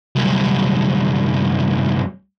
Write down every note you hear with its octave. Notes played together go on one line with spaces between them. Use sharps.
C2 F#2